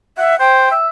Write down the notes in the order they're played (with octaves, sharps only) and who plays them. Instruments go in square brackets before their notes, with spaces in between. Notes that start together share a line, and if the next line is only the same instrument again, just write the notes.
[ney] E5 [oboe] F#5
[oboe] C5 [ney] G5
[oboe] E5